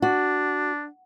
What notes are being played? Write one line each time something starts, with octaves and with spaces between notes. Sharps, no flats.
D4 F#4